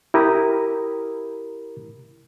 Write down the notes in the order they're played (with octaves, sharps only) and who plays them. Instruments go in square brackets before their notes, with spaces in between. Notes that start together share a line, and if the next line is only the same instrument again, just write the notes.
[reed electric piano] E4 G4 A#4 A#5 B5 D#6